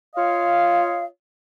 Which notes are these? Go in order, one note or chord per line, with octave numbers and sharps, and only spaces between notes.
F4 C#5 D#5 F5